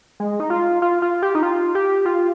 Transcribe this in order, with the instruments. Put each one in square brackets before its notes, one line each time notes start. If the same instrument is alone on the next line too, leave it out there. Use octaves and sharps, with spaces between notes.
[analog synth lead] G#3
D#4
F4
F4
F4
G4
D#4
F4
G4
F4